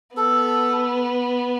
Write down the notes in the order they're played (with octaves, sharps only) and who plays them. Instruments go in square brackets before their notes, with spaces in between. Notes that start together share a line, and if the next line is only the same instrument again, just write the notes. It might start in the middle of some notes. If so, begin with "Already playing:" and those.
[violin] B3 [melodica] A4